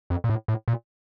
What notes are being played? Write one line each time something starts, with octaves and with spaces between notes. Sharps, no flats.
F2
A#2
A2
A2
A#2